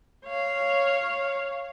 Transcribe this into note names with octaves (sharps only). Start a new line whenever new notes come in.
C#5 F5